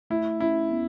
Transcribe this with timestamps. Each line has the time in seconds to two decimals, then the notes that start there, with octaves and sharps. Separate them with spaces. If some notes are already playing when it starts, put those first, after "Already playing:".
0.10 A3 E4
0.40 C#4 E4
0.71 B3